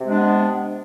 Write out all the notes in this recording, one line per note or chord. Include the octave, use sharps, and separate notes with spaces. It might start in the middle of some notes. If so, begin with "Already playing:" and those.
C3 G#3 B3 D4